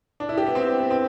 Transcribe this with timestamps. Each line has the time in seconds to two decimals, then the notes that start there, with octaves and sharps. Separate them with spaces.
0.20 D4
0.29 E4
0.37 G4
0.47 B3
0.55 C4
0.78 B3
0.90 C4